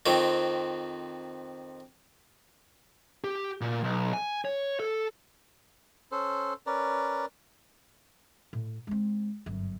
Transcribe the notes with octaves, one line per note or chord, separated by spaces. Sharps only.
F2 D#3 C4
G4
A#2
B1
G#5
C#5
A4
C#4 A4 C5
C#4 A#4 B4 D5
A2
G#3 C4
G1 F#2